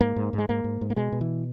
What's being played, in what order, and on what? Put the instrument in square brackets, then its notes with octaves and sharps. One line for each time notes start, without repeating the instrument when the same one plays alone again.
[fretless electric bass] G#2 A#3
G#2
G#2
G#3
G#2 A#3
G#2
G#2
A#3
B2 G#3
B2
E3